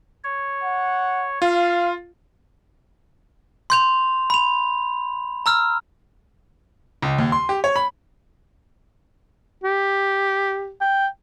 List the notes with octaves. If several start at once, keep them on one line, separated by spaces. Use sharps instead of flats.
C#5
F#5
F4 F5
C6 G6 F7
B5 F7
A#5 E6 F6
C#2
D#2
C6
G4
C#5
B5
G4
G5